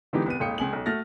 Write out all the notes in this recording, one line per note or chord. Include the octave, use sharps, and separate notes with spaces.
D3 E3 G#3 B3 D#4 G4
C2 B3 D#7
D#1 G#1 F5 G5 D#6 C#7
C#2 G#5 F#7
B1
A3 F#4 F6 A6 A#6